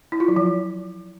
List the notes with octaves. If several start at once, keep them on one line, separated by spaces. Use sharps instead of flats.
E4
F4
F#3
F3